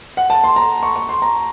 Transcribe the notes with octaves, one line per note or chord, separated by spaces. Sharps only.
F#5
A5
C6
A#5
C#6
C#6
C6
A#5